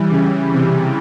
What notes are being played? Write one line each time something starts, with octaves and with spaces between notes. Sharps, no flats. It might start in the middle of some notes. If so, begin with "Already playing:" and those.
Already playing: E3 G3
C#3
C3